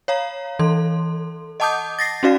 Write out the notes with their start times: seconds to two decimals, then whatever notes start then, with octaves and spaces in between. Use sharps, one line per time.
0.08 C#5 F5 A#5
0.59 E3 A4 C6
1.60 D#5 F#5 A5 D6 D#6 G6
1.99 A6 A#6 C7
2.23 C#4 D#4 F#4 D5 F5